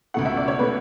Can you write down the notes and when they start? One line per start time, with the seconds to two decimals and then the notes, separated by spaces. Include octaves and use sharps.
0.14 C#2 B2 A3 F#5
0.25 E5
0.37 D5
0.48 C#5
0.59 B2 A3 B4